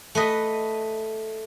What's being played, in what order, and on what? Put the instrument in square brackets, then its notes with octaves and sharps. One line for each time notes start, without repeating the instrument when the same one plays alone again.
[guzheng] A3 B4 D#5